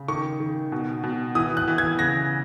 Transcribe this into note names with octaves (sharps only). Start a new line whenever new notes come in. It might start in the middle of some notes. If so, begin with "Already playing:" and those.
Already playing: C#3
D#3 C#6
D#3
B2
B2
E3 D#6
F#6
E3
G#6
C#3 A#6